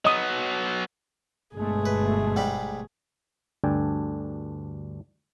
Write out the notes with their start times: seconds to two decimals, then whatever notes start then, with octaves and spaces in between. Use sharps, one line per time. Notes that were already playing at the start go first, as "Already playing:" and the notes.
0.05 F#3 B3 D#5 D#6
1.55 G1 B2 G#3 A3 G#4
1.86 B4
2.36 G#2 G3 B5
3.64 D2 G2 D4 A4 G5 G#5